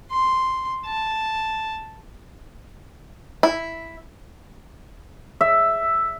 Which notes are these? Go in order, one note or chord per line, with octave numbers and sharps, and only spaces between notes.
C6
A5
E4
E5